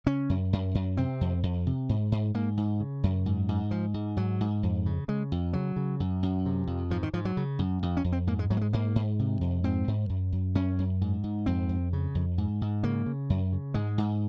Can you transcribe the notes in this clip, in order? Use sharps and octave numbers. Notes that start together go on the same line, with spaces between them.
C#3 C#4
F#2
F#2
F#2
C3 C4
F2
F2
C3
G#2
G#2
G#2 A#3
G#2
C#3
F#2
G#2
G#2
G#2 F3
G#2
G#2 F#3
G#2
F2
C#3
C#3 G#3
F2
C#3 F#3
C#3
F#2
F#2
C3
F2
G#2 F3
D#3
G#2 F3
F#3
C#3
F#2
F2
C#4
F2
C4
G#2 A#3
G#3
G#2 F#3
A#3
G#3
G#2 A#3
G#2
C3
F2
G#2 C4
G#2
F#2
F#2
F#2 C#4
F#2
G#2
G#2
F2 C4
F2
C#3
F2
G#2
G#2
C#3 A#3
C#3
F#2
C#3
G#2 G#3
G#2